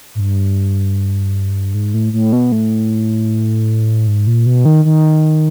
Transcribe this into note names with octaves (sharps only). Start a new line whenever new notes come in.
G#2
G2
G#2
A2
A2
B2
A2
G#2
A#2
B2
D#3
D#3